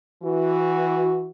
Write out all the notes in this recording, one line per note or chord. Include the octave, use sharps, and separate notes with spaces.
E3 F#4